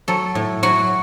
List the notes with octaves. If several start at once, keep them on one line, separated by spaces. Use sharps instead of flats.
F#3 A4
A2
F#3 F#4